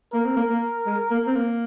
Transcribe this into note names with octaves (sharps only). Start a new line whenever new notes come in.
A#3 A#4
C4
A#3
A#3
G#3
A#3
C4
A#3